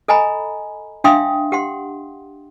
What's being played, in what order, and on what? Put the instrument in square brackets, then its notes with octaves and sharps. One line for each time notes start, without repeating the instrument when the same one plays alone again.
[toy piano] A4 D#5 G#5 A#5 B5
D4 E5 F5 G5 C6 D#6
G4 F#5 C6